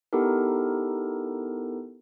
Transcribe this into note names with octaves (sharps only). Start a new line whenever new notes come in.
B3 D#4 E4 G4 A4 A#4